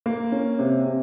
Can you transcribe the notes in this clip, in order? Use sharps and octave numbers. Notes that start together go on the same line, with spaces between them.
A#3
C#4
C3
C3